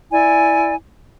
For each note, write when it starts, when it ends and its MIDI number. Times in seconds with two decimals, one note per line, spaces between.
0.11 0.75 64
0.11 0.75 74
0.11 0.75 80